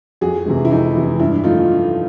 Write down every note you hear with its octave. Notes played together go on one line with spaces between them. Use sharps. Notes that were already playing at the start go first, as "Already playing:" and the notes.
F2 F#4 G#4
C3 E3 G#3
E4
F2 D#4
C3 E3 G#3
G2 E4
D3 F3 A3 D#4 F4